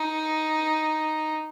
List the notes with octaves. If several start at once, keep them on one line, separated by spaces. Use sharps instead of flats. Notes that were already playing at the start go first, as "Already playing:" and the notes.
Already playing: D#4